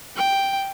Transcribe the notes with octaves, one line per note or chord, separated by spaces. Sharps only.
G5